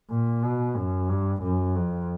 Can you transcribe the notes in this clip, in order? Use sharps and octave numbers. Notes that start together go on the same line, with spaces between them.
A#2
B2
F#2
G2
F#2
F2